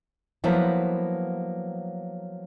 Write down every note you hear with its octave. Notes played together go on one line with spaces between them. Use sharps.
F3 F#3 A#3 B3 E4